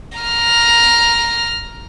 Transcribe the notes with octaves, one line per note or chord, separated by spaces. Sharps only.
A#5 F6